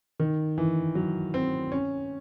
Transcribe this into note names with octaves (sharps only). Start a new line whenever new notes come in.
D#3
E3
F#3
C4
C#4